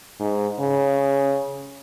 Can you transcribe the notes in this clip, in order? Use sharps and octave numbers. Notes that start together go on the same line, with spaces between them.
G#2
C#3